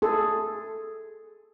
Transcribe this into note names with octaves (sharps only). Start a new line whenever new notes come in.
G#4 A4